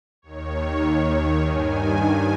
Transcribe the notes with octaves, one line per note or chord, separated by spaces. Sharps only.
D#2 D#3 C#5
G2 D#3 G#5